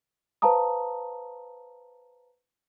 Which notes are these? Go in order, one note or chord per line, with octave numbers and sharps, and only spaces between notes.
B4 C5 F5 A5 A#5 D#6